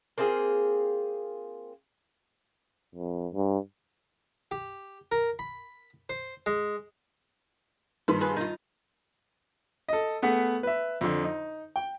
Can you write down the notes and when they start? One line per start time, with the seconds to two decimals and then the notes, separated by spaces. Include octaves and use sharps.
0.18 A#3 C4 F4 G#4
2.95 F2
3.33 G2
4.51 G4
5.12 A#4
5.39 B5
6.09 C5
6.46 G#3
8.08 G2 D#3 B4 C6
8.21 F4 G#4 B4
8.36 D#4 F4
9.88 A4 D#5
10.22 A3 B3 G#4 F#5
10.63 B4 E5
11.01 F2 D3
11.24 D#4
11.76 G5